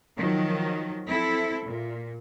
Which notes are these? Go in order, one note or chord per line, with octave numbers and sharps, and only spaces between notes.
D#3 F3 F#3
C4 E4 A4
A#2